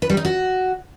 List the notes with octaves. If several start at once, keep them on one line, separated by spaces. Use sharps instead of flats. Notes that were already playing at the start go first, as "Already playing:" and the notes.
B4
G3
D#4
F#4